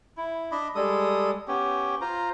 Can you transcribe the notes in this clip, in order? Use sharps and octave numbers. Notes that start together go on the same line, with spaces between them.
E4
D4 D#5 B5
G3 G#3 A4 D#6
B3 C#4 G4
F4 C5 A#5